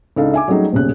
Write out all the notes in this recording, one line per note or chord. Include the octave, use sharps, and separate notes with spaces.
C#2 D4 D#4 A4 F5
E5 G#5 D6
F#3 G3 A3 C#4 D#4 G#4
D#1 B1 C#3 F#6